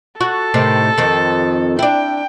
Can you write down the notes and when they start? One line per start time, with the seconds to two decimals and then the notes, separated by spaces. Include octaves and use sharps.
0.21 F#4 A4
0.54 A2 C3 D#3
0.98 F2 D#3
1.79 D4 E4 G5